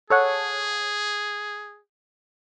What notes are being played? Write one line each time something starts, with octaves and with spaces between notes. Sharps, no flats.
G#4 A4 C#5 F#5